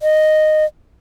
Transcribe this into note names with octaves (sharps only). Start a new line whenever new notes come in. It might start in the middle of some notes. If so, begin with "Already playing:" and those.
D#5